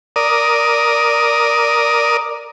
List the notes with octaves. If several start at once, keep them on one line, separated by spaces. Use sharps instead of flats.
A#4 D5 D#6